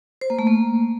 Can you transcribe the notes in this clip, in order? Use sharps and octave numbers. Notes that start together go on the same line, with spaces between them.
C5
A#3
A3
A#3